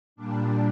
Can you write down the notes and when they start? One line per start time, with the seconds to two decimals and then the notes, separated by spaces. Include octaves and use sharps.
0.16 A#2 G3 D4